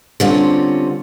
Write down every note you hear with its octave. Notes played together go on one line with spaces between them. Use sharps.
D3 G3 C4 C#4 F4 F#4